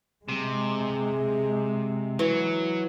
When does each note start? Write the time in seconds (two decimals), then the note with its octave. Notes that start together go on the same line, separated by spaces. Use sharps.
0.29 C3 G#3
2.19 E3 F#3